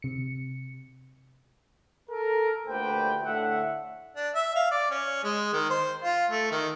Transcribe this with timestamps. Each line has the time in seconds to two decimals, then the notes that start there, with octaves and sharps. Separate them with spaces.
0.02 C3 C#7
2.10 A4 A#4
2.67 D2 A#2 G4 B4 C5 G5
3.22 A2 D3 E5 F#5
4.16 D4
4.35 E5
4.55 F5
4.71 D5
4.91 C#4
5.24 G#3
5.53 D#3
5.70 C5
6.04 F4
6.31 A3
6.51 D#3